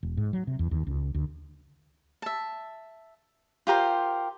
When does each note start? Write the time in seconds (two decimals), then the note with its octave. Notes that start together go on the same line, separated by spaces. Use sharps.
0.03 E1
0.17 G#2
0.33 F#3
0.47 C3
0.59 E2
0.71 D#2
0.87 C#2
1.15 D2
2.22 E5 A5
3.67 F4 G4 A#4 C5